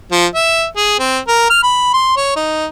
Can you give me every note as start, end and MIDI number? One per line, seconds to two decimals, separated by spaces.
0.12 0.26 53
0.35 0.65 76
0.76 0.97 68
0.99 1.18 60
1.28 1.49 70
1.50 1.61 89
1.63 1.93 83
1.93 2.13 84
2.16 2.34 73
2.36 2.66 63